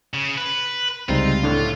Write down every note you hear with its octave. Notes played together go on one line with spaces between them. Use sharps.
C#3
B4
C#2 C3 G3 G#3 C4 D#4 F4
A2 D3 D4 E4 A4